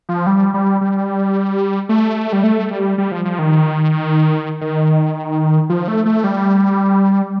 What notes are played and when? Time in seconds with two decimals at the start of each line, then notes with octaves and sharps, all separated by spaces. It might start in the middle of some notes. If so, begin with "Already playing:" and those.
0.09 F3
0.27 G3
0.54 G3
0.81 G3
1.89 A3
2.33 G3
2.44 A3
2.71 G3
2.98 G3
3.12 F3
3.25 F3
3.39 D#3
4.61 D#3
5.69 F3
5.88 A3
6.05 A3
6.24 G3